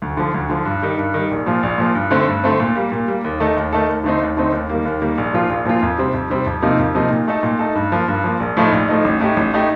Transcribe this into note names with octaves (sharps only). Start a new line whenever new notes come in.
D2
D3 F3
D2
D3 F3
G2
D#3 G3
G2
D#3 G3
A#1
A#2 F3
A#1
A#2 F3
G2
D3 A3 C4
G2
D3 A3 C4
A#2
G3 A#3
A#2
G3 A#3
D#2
D#3 A3 D#4 A4
D#2
D#3 A3 D#4 A4
D#2
D3 A3 C4 D#4
D#2
D3 A3 C4 D#4
D#2
D#3 G3 A#3
D#2
D#3 G3 A#3
A#1
A#2 F3 A#3 F4
A#1
A#2 F3 A#3 F4
F2
C3 G3 C4
F2
C3 G3 C4
F2
C3 F3 A#3 D#4
F2
C3 F3 A#3 D#4
A#2
A3 D#4 A4
A#2
A3 D#4 A4
G2
F3 A#3
G2
F3 A#3
A#1
A2 F3 A3 D#4
A#1
A2 F3 A3 D#4
A1
A2 A3 D#4 G4
A1
A2 A3 D#4 G4